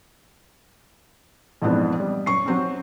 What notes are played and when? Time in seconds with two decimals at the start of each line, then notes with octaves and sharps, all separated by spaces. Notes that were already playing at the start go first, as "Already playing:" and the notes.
1.62 F2 G#2 E3 B3 C4 D4
2.00 G3
2.26 F#2 C#6 C7
2.46 F#3 C4 C#4